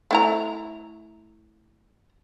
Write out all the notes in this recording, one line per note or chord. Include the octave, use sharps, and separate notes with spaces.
A3 E4 A#5